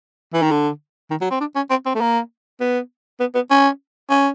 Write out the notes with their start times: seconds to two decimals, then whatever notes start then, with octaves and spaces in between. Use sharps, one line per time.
0.34 E3
0.42 D#3
0.51 D3
1.11 D#3
1.21 F#3
1.31 C4
1.40 D4
1.56 C#4
1.70 C4
1.86 C4
1.95 A3
2.01 A#3
2.60 B3
3.20 B3
3.35 B3
3.51 C#4
4.10 C#4